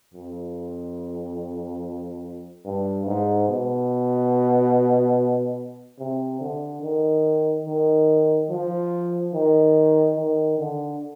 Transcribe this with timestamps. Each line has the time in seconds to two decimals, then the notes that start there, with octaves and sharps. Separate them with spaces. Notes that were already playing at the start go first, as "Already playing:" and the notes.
0.14 F2
2.65 G2
3.06 G#2
3.48 B2
5.99 C3
6.41 D3
6.82 D#3
7.66 D#3
8.50 F3
9.33 D#3
10.16 D#3
10.58 D3